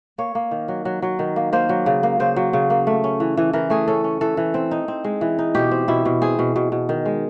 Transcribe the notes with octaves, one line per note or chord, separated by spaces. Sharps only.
A#3 C#5
A#3
D#3
F#3
F#3
F#3
D#3
A#3
A#3 C5
F#3
C#3
A#3
C#3 C5
F#3
C#3
A#3
A3
C#4
E3
E3
E3 A#4
A3 G#4
C#4 A4
C#4
E3 A4
E3
C4
D#4
C4
G#3
E3
D#4
B2 G4
C4
B2 E4
B2
C4 G#4
B2
B2
B2
D#3
G#3